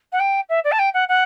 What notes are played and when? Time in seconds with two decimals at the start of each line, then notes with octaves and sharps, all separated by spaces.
0.12 F#5
0.20 G5
0.49 E5
0.64 D5
0.72 A5
0.79 G5
0.94 F#5
1.09 F#5